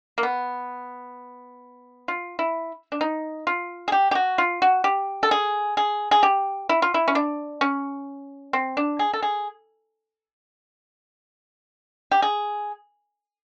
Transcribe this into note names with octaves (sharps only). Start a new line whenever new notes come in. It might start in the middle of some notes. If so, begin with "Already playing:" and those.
A#3
B3
F4
E4
D4
D#4
F4
G#4
G4
G4
F#4
F4
F#4
G4
A4
G#4
G#4
G#4
G4
E4
F4
E4
C#4
D4
C#4
C4
D4
G#4
A4
G#4
G4
G#4